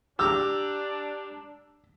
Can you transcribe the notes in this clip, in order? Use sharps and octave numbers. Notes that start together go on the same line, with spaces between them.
D4 G4 A#5 E6